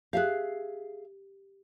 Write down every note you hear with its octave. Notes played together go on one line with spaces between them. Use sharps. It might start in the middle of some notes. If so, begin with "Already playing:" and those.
G4 G#4 E5 F5 F#6